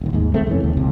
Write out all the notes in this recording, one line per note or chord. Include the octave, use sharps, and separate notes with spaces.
D#1 A1 D#2
D#2 G#2 G#3
D#2 G#3 A3 C4
F2 C3 E3 C#4
D#2
C#2 C3